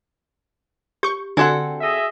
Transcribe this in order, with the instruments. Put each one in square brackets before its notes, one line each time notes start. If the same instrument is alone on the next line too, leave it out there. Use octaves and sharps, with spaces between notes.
[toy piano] G4 [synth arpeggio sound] C#6 G6
[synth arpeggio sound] D3 [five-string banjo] C4 A4 F#5 [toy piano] F#4 D5 G#5
[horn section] G#4 D#5 E5